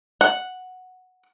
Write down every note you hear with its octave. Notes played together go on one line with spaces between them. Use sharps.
F#5